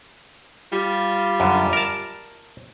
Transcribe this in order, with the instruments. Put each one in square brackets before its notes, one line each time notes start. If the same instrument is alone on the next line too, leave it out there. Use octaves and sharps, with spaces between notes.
[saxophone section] G3 F4
[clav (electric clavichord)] F#2 D3
A#4 A5